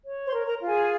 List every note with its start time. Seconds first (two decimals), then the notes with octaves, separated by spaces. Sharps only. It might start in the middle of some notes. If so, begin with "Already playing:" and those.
0.05 C#5
0.26 C5 C6
0.33 A#4
0.46 A#4 A#5
0.61 F4
0.67 G#4 G#5